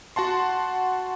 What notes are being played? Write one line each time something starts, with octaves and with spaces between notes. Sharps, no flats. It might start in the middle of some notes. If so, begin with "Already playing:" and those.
F#4 F#5 A5 C6